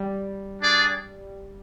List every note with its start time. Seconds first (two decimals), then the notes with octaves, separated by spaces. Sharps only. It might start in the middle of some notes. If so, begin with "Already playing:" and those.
Already playing: G3
0.60 D4 G#4 D5